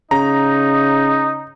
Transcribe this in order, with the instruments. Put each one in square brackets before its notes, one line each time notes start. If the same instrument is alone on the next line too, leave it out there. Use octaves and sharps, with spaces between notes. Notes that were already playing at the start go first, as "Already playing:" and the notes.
[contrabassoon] C#3 [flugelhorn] D#4 [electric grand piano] A#5